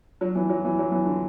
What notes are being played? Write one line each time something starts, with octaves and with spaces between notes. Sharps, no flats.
F#3
E3
F#3
E3
F#3
E3
D3